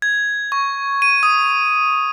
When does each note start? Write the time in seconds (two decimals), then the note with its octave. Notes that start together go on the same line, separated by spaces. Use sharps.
0.02 G#6
0.52 C#6
1.02 D#7
1.23 D#6